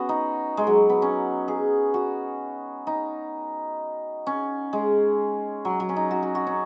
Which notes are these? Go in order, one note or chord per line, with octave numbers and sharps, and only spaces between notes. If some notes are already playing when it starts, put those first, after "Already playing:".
Already playing: B3 C#4 F#4
D#4
G#3
F#3
B3
C#4
G#4
F#4
D#4
C#4
G#3
F#3
F#3
C#4
D#4
F#4
F#4
F#4
C#4